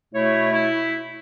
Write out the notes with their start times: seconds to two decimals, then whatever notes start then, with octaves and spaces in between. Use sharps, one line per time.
0.13 B2 A3 E4 C#5
0.52 E4